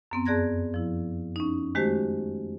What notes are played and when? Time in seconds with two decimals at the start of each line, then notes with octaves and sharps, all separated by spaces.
0.11 F#2 B3 C4
0.26 F2 G#4 D5 F#6 G#6 A#6
0.74 F3 E4
1.36 C#4 D#4
1.75 D#3 G#3 A3 F#4 G4 C5